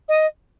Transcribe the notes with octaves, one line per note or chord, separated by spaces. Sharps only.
D#5